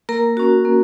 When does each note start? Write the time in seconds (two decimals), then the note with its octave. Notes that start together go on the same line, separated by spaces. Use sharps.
0.09 A#3 A#4 A#5
0.37 C#4 F#4
0.65 A#3